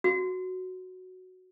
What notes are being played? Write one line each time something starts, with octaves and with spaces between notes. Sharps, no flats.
F#4